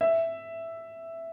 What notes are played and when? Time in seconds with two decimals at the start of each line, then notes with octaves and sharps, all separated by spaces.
0.01 E5